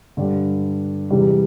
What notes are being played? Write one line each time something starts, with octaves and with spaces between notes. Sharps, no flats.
G2 D3 G3
E2 C3 G3